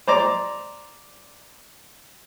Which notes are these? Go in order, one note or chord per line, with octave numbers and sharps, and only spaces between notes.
C5 D5 A#5 D6